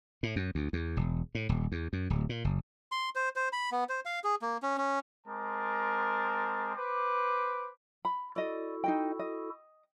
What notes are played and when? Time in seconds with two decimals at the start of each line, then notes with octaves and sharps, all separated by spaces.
0.23 A2
0.36 F#2
0.55 D2
0.73 E2
0.97 E1
1.35 A2
1.49 D#1
1.72 E2
1.93 F#2
2.10 D1
2.29 A#2
2.44 F#1
2.92 C6
3.15 C5
3.36 C5
3.53 B5
3.72 B3
3.89 C5
4.05 F5
4.24 G#4
4.42 A#3
4.63 C#4
4.78 C#4
5.27 G#3 C4 A#4 A5 D6
6.75 B4 C5 D6
8.05 B5
8.36 E4 F#4 A4 D5 D#5
8.84 D#4 D#5 G5
9.19 D#5